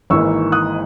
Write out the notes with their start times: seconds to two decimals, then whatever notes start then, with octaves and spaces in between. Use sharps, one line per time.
0.10 G#1 G#2 E3 A#3 C#6 E6
0.52 D#6 F#6